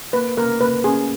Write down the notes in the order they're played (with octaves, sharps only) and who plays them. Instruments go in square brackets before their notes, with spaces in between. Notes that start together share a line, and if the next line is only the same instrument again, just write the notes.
[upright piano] A#3 [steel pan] B4
[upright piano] A#3 [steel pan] A#4
[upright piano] A#3 [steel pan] B4
[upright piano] C#3 [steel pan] G#4